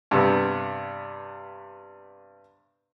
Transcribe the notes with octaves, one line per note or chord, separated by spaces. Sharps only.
G2 C3 B3